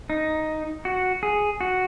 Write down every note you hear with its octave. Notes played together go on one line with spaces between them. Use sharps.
D#4
F#4
G#4
F#4